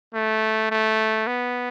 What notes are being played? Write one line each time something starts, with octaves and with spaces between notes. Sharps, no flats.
A3
A3
B3